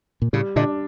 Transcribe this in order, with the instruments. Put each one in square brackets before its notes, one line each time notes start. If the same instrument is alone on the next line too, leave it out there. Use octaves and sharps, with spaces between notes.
[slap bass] A#2
[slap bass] A2 C#3 [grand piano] G3
[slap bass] A#2 D3 [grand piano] D4